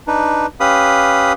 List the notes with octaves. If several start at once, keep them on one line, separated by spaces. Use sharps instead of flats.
D4 D#4 B4
C#4 G4 B4 F5 B5 D#6